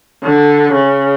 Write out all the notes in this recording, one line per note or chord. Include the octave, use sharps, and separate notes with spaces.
D3
C#3